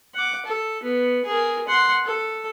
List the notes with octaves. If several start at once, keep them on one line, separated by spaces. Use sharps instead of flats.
F#5 D6
A4
B3
G#4 A#4
F#5 C6
A4